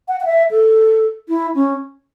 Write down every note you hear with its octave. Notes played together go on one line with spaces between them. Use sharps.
F#5
F#5
E5
A4
E4
C#4